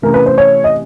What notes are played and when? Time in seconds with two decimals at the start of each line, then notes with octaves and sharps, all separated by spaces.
0.02 C3 E3 A3 C#4 A#4
0.14 B4
0.26 C5
0.38 C#5
0.64 D#5